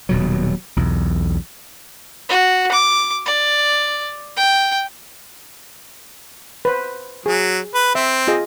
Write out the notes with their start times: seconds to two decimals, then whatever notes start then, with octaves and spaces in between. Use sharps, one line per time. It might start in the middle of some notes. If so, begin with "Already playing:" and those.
0.09 D#1 B2 F#3
0.76 B1 E2
2.29 F#4
2.72 D6
3.26 D5
4.37 G5
6.65 B4 C5
7.26 F#3 G#4
7.74 B4
7.95 C4 E5
8.28 F4 G#4 D#5